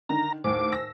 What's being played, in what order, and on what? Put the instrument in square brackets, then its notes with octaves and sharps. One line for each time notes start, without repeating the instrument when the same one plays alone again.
[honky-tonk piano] D3 D#3 [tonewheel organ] A#5
[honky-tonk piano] D#2 A2 [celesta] C5 [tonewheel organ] D6
[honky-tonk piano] E6 A#6